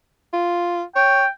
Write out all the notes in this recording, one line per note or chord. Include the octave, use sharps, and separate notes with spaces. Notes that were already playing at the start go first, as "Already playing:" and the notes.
F4
C#5 G5